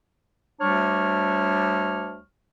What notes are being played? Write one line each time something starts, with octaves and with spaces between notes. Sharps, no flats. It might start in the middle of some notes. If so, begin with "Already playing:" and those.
D2 G3 D4 C#5 C#6 F6